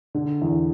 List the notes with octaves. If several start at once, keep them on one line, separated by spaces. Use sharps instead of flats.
D3
E2